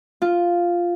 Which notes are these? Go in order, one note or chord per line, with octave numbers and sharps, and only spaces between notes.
F4